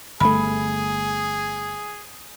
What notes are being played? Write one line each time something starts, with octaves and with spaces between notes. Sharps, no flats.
G1 A3 G#4 B5